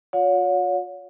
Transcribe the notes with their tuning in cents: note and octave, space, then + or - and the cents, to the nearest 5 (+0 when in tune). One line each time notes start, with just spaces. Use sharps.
F4 +45 C#5 +30 F#5 -45